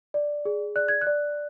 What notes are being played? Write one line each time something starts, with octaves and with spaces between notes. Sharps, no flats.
D5
G#4
D5 F#6
G#6
F#6
D5